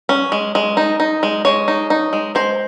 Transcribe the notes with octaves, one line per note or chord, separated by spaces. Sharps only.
C#4
G#3
G#3
D#4
D#4
G#3
G#3 C#5
D#4
D#4
G#3
G#3 C5